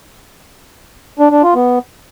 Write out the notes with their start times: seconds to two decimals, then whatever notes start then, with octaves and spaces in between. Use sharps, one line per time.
1.19 D4
1.31 D4
1.43 F4
1.55 B3